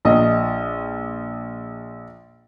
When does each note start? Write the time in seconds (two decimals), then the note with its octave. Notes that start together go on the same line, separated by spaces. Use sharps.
0.05 A#1 D#5